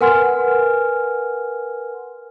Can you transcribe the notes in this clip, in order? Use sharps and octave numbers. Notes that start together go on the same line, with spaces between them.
A#4 B4 F#5 G#5 C6 F6